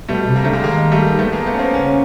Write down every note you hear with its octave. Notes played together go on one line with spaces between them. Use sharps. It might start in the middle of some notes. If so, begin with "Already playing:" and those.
B2 G3 A3
C3
A#3
D3 A3
G#3 A#3
D#3 G#3 A#3
G3 A3
A3 B3
G#3 A#3
A3 B3
C#4
A#3 C4
C#3 B3 C#4